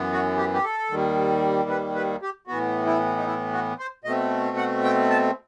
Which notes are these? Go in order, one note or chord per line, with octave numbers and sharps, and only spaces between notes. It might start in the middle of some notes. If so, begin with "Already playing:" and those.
Already playing: F#2 E3 B3
F#4
G4
G4
A4
D#2 D#3 G3
B4
B4
G4
A2 E3 B3 F#4
E4
D#4
E4
F#4
C5
B2 A3 C4 D#5
F#5
G5
A5